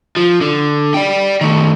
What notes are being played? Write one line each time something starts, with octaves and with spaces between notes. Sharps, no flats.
F3
D3
D5 G5
D#3 A3